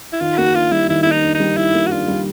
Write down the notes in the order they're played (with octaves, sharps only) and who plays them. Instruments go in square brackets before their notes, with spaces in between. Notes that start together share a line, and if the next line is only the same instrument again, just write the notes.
[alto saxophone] E4
[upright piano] D#3 [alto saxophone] F4
[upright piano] A#3 [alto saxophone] F#4
[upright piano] D4 [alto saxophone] F4
[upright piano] G3 [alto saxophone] E4
[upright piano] D#3 [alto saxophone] E4
[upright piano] A#3 [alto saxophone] E4
[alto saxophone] D#4
[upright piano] D4
[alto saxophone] D#4
[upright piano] G3
[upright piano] D#3 [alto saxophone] E4
[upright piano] A#3
[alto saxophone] F#4
[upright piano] D4 [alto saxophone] F4
[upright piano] G3